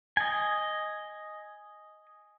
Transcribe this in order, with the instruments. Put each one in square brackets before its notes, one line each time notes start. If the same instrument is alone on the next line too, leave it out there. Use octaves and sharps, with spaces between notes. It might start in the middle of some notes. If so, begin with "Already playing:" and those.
[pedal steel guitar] D#5 G#5